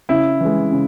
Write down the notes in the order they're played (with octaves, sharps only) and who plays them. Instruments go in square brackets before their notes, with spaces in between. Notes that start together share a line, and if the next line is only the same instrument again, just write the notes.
[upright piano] C#3 E4
E3 G#3
C#3